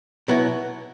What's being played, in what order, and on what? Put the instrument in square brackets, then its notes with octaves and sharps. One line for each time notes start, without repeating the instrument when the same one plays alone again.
[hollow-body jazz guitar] B2 F#3 B3 E4